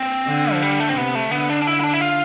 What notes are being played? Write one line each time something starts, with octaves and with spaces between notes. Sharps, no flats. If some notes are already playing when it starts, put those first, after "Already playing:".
Already playing: C4
D3
F3
G3
A3
C4
C3 B3
A3
D3 B3
D4
D4
E4
E4
D4
E4
F4